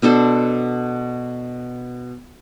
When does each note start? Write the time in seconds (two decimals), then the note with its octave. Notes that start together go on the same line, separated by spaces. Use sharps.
0.02 B2 D4 A4 C5